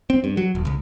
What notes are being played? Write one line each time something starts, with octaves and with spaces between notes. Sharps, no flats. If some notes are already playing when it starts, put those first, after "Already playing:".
C4
G2
F#3
D#1
C#2